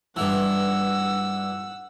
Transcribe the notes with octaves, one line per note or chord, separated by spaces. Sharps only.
G2 E3 F#5 E6